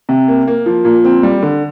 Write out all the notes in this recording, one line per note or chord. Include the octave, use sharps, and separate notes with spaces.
C3
A#3
A#3
F3
A#2
C4
G3
D3